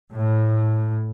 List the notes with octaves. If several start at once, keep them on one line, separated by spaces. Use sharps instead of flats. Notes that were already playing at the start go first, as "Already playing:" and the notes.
A2